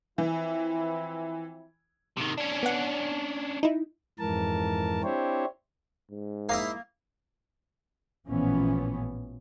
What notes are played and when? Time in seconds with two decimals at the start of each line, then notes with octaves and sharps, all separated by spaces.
0.18 E3 F3 C4 E4
2.17 C3 D#3
2.37 C#4 D4
2.63 B3 F#5
3.63 D#4 E4
4.19 F2 G#2 E3 A#4 A5
5.03 C4 D4 E4 G4 C5 C#5
6.11 G#2
6.49 A#3 E4 D#5 F5
8.28 A1 A#2 E3 F3 B3 C#4